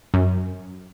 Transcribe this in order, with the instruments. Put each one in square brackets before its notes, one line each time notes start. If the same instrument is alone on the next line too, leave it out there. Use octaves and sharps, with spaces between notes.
[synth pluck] F#2